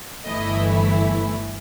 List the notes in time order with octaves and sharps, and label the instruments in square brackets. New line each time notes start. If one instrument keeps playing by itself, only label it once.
[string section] G1 G2 E3 A3 E4 D#5